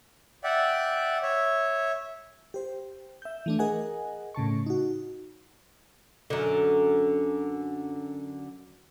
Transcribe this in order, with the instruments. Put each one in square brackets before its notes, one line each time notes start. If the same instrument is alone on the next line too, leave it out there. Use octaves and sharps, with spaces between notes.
[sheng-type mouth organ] D5 E5 F#5 G5
C#5 E5
[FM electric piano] G4 C5
E5 G6
E3 A3 D4
G#4 A#4 D#5 F#5 G#5
A2 C#3 A5 C#6
D#4 F#4
[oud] F#2 D3